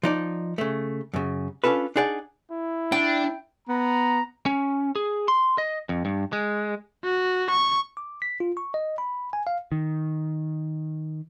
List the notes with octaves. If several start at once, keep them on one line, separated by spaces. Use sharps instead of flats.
F3 D#4 D5
C#3 A3
F#2 C#3
C#4 D4 F4 A4 B4
D4 D#4 G#4 D5 F#5
E4
D4 G5
B3 A#5
C#4
G#4
C6
D#5
F2
G2
G#3
F#4
C#6
D6
B6
F4
C#6
D#5
B5
G#5
F5
D#3